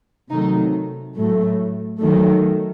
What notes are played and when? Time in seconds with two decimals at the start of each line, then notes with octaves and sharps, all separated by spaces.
0.30 C3 D#3 F#3 A3 D#4
1.16 A2 F#3 A3
2.01 D#3 F#3 A3